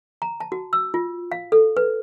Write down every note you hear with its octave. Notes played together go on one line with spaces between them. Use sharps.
A#5
A5
F#4
E6
F4
F5
A4
B4